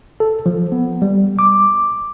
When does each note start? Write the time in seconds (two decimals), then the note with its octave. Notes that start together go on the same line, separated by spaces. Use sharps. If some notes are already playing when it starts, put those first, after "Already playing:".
0.20 A4
0.46 F3
0.72 B3
1.02 G3
1.39 D6